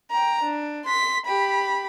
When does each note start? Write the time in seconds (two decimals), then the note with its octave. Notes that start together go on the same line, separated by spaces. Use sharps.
0.11 G5 A#5
0.43 D4
0.84 C6 B6
1.26 G4 B5